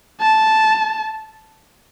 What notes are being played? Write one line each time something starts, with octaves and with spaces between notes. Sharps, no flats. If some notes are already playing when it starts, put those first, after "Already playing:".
A5